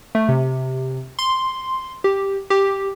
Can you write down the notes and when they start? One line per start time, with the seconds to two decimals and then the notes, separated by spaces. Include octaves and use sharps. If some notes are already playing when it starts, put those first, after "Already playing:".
0.15 A3
0.29 C3
1.19 C6
2.04 G4
2.50 G4